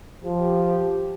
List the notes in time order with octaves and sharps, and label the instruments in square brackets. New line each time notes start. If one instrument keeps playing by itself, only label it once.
[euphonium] F3 [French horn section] G4